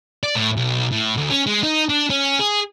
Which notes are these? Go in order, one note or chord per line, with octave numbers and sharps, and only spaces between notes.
D5
A2
B1
A2
D2
C#4
G#3
D#4
D4
C#4
G#4